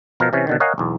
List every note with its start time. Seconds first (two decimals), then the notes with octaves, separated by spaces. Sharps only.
0.20 B2 F3 A#4
0.33 C3 E3 C#4
0.47 B2 D3 D#3
0.60 A#4 C#5 D#5 F5 F#5 G#5
0.78 B1 E2